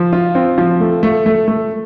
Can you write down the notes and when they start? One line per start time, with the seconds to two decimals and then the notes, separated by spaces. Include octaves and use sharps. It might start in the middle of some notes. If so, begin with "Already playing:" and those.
Already playing: F3
0.13 F4
0.35 C4
0.58 F3
0.80 A3
1.03 A3
1.26 A3
1.48 A3